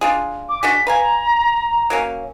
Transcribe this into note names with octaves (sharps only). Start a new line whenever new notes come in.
D4 F4 G#4
D6
D4 F#4 G#4 B6
B4 F5 G#5 A#5
F#3 A#3 C#4